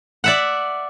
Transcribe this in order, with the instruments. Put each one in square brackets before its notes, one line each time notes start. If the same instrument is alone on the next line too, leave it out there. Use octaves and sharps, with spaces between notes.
[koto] D5 E5 F#5